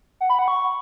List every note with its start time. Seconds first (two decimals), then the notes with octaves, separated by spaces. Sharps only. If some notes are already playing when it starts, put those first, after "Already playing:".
0.21 F#5
0.30 B5
0.39 F#5
0.48 C#6